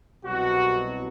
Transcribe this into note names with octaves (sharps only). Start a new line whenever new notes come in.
C2 B2 F#3 F#4